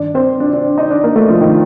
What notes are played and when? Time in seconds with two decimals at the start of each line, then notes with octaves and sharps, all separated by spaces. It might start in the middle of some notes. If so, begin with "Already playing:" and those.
Already playing: G2 D#3 D4 D5
0.15 C4 C5
0.40 D4 D5
0.53 D4 D5
0.78 D#4 D#5
0.90 D4 D5
1.04 A#3 A#4
1.15 A3 A4
1.28 F3 F4
1.41 D#3 D#4